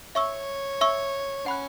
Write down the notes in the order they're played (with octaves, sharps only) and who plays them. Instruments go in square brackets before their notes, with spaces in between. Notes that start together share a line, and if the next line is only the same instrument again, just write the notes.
[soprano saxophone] C#5 [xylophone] E5 C#6 E6
[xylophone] E5 C#6 E6
[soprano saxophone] C#4 [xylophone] F#5 B5 F#6